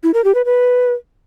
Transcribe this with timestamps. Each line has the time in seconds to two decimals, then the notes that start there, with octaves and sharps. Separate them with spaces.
0.03 E4
0.14 A#4
0.24 G4
0.35 B4
0.45 B4